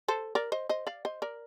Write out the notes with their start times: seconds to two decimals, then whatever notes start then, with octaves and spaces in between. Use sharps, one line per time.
0.08 A4 C5
0.35 A#4 D5
0.52 C5 D#5
0.69 C5 D#5
0.87 D5 F5
1.05 C5 D#5
1.22 A#4 D5